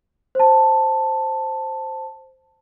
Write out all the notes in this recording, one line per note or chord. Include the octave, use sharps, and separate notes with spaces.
C5 A5